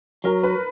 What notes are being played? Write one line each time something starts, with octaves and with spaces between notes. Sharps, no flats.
F#3 A#4
B4